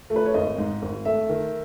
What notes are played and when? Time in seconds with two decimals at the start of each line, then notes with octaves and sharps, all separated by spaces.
0.10 A3
0.16 B4
0.25 C#5
0.34 G#1 D#5
0.58 G#2
0.82 G#1
1.05 A3 E5
1.29 D#3